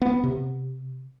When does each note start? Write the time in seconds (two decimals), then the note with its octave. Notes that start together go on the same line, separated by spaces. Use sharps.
0.02 B3
0.24 C3